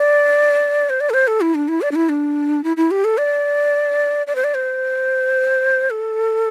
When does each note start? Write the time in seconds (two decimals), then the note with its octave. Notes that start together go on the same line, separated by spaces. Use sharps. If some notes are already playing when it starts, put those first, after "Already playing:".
Already playing: D5
0.90 C5
1.01 D5
1.10 A4
1.14 C5
1.27 A4
1.41 E4
1.55 D4
1.68 E4
1.82 D5
1.91 D4
1.95 E4
2.09 D4
2.64 E4
2.77 E4
2.91 G4
3.04 A4
3.18 D5
4.27 D5
4.35 C5
4.44 D5
4.54 C5
5.90 A4